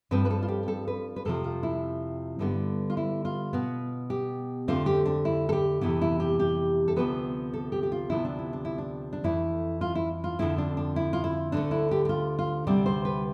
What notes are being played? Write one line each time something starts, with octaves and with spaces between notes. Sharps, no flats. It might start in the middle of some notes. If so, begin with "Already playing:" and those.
G2 F3 C4 B4
B4
A4
F4
G4
G4
A4
B4
B4
F2 C3 F3 A4
F4
E4
G2 D3 G3 B3
F4
E4
F4
B2 B3
G4
F2 D3 A3 C4 F4
G4
D4
E4
A4
G4
F2 C3 E3 B3 G4
E4
G4
G4
A4
D2 C3 F3 B3 B4
A4
G4
G4
F4
D2 C3 F3 B3 E4
D4
E4
D4
E4
D4
D4
F2 E3 A3 E4
F4
E4
F4
F2 D3 F3 C4 E4
D4
D4
E4
F4
E4
D2 D3 A3 D4
E4
G4
G4
F4
F4
D2 C3 G3 C4 D5
C5
B4